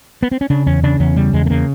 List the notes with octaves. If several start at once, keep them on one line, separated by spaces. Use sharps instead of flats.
B3
C4
C#4
C#3 D4
E2 C#4
C#3 D4
E2 C#4
C#3 G3
E2 G#3
A3
C#3 A#3